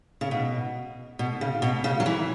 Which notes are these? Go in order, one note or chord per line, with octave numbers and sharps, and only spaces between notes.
C#3
B2
B2
C#3
B2
C#3
F#3
E3